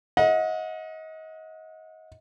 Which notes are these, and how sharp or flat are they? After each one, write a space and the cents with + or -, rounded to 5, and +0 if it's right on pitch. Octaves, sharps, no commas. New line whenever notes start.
D#5 +30 F#5 -30